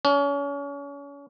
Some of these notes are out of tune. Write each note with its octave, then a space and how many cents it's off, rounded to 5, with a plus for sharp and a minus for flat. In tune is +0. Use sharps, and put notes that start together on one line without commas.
C#4 +35